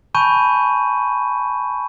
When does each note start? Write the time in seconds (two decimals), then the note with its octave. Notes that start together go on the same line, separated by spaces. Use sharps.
0.15 G#5 A5 B5 C#6 G6 D#7